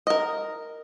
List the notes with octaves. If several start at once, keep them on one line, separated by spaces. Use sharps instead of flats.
A#4 D#5